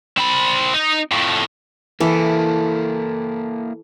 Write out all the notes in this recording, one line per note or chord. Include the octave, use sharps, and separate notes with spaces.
C4 B5
D#4
F2 A2
E3 A#3 E4 A4